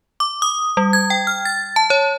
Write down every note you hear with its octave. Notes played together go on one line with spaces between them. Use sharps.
D6
D#6
G3
G#6
G5
F6
A6
A5
C#5